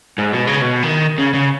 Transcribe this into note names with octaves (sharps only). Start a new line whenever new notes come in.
G#2
B2
C#3
B2
D#3
C#3
C#3